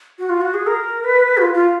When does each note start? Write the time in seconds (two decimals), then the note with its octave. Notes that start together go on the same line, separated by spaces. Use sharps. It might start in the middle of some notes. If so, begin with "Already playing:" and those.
0.19 F#4
0.29 F4
0.41 F#4
0.54 G#4
0.67 A#4
1.04 B4
1.37 F#4
1.42 F4
1.54 F4